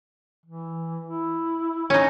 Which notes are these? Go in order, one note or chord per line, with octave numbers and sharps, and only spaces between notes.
E3
E4
C#4 D#4